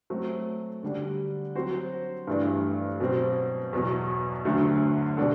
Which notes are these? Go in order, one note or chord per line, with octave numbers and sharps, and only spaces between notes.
F#3 A3 C4
D3 G3 D4
F#3 C4 F#4 C5
G2 E3 A3 D4
B2 F#3 C4
E2 B2 F#3
D2 D3 F#3 A3
B2 G3 D4 F#4 A4